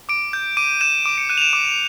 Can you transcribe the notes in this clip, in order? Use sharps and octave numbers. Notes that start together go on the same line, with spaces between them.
D6 D7
G6
D6 D#7
G6 E7
D6 D7
C#7
F#6 D#7
F7
E7
D6